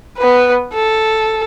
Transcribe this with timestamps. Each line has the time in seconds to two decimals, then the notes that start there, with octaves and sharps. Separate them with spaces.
0.18 B3 B4
0.73 A4